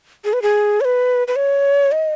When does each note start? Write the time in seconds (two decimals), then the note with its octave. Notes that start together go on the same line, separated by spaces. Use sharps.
0.25 G#4
0.33 B4
0.42 G#4
0.81 C#5
0.85 B4
1.28 B4
1.36 C#5
1.92 D#5